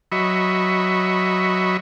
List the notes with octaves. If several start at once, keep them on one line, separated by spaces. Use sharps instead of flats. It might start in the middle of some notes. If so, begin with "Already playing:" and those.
F#3 D#5 E5 B5 C#6